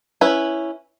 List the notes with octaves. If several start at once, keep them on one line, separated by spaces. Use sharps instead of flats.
C#4 E4 B4